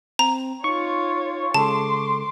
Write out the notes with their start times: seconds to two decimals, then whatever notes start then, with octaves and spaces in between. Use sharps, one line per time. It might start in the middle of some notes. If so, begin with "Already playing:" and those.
0.19 C4 A#5
0.64 D#4 F4 C#5 C#6
1.54 C#3 G#3 A4 A5 C6 D6